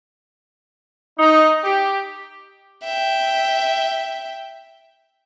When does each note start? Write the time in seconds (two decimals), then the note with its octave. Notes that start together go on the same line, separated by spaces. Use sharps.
1.19 D#4
1.64 G4
2.84 E5 G5